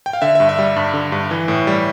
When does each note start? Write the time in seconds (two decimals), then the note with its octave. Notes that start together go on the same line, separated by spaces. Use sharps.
0.06 G5
0.13 F5
0.22 D3 E5
0.35 E5
0.40 G2
0.49 E5
0.59 G3
0.76 G2
0.94 D3
1.12 G2
1.31 E3
1.48 A2
1.67 G3